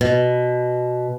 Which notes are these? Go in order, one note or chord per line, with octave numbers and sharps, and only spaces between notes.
B2